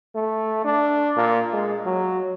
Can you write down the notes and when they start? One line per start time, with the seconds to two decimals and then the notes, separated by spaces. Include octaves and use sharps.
0.15 A3
0.65 D4
1.17 A#2
1.53 G#3
1.86 F#3